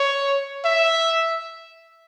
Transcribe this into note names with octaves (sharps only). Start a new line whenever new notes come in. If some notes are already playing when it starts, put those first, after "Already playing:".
Already playing: C#5
E5